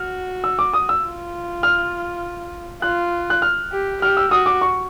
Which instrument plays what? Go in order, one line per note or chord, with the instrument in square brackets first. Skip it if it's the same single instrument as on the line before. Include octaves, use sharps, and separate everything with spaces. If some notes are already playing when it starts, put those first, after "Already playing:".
Already playing: [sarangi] F#4 [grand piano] F6
[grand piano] E6
D6
D#6
E6
[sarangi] F4
[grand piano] F6
[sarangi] F4 [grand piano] F#6
[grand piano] F#6
F6
[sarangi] G4
[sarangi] G4 [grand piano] F6
[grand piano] E6
[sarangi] F#4 [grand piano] D#6
[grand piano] D6
C#6